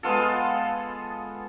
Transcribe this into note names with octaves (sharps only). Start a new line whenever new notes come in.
G#3 B3 F4 A4